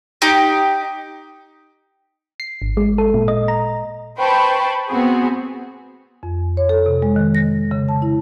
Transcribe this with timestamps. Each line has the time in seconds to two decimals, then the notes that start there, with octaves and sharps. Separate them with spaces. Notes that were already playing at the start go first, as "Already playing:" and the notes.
0.22 D#4 G4
2.40 C7
2.62 G#1
2.77 G#3
2.98 A4
3.14 A#2
3.28 D#5
3.48 A#5
4.17 B4 C5 G5 A5 B5 C#6
4.90 B3 C4 F#4 G#4
6.23 F2
6.57 C#5
6.69 A4
6.86 C3
7.02 G#3
7.16 D#3
7.35 A#6
7.71 C#3
7.89 A5
8.02 E4